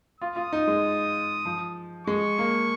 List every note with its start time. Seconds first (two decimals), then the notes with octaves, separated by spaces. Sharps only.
0.20 F4 D#6
0.36 F4
0.53 D#4
0.68 G#3
1.45 F3
2.07 G#3 C#6
2.38 A#3